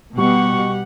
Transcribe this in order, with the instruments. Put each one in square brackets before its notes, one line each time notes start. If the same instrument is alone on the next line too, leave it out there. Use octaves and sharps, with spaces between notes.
[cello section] B2 [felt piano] G3 [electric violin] G4 F#5 [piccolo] C#6